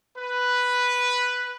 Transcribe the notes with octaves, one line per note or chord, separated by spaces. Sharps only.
B4